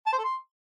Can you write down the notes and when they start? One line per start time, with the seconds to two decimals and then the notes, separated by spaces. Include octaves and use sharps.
0.06 A5
0.12 C5
0.18 A4
0.24 C6